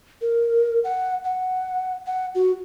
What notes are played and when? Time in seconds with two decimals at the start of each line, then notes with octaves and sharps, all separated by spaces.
0.21 A#4
0.84 F#5
1.24 F#5
2.06 F#5
2.35 F#4